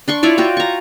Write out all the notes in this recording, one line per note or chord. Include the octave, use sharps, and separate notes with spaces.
D4 C6 C#6
E4 F4 C#5 D5
F4 F#4 G5
A#5 C#6